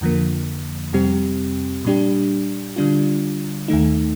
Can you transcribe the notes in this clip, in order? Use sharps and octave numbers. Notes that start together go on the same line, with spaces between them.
F2 D3 F3 A#3
F2 C3 G3 C4 G4
A#2 G3 D4 G4
D3 G3 D4 F4
D#2 D#3 A3 D#4